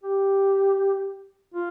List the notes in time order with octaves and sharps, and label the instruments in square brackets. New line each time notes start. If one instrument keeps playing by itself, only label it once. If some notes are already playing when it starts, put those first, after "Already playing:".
[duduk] G4
F4